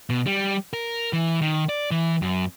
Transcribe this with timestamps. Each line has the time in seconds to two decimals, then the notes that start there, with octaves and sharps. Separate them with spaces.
0.10 B2
0.26 G3
0.73 A#4
1.13 E3
1.42 D#3
1.69 D5
1.91 E3
2.22 F#2